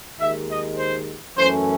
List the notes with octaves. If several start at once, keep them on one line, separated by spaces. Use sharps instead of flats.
D#2 D#3 G#3 E5
D#5
C5
F#2 E3 A3 C#4 C5